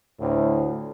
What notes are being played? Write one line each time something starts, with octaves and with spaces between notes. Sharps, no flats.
D2 A2